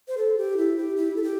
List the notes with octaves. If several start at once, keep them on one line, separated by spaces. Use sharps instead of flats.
C5
A4
G4
E4
G4
E4
A4
G4